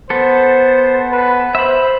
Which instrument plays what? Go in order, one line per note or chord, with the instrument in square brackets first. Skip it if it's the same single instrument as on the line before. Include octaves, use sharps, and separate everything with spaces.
[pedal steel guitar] B3 A4 [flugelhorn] C5
[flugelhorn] B4
[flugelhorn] C5 [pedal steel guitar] E5 B5